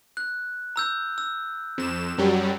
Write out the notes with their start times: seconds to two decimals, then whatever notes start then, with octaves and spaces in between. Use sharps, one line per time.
0.17 F#6
0.76 A#5 E6 G6
1.18 E6
1.78 F2 E7
2.18 F#2 F#3 G3